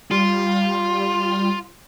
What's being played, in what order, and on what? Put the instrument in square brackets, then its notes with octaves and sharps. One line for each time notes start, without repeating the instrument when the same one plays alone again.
[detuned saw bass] G3 [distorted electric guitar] F4